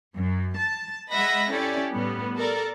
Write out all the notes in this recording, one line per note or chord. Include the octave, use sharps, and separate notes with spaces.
F#2
A5
G#3 D#5 E5 F#5 B5 A#6
C#4 E4 G4 A4 D5
A2 G3 B3
A4 A#4 D5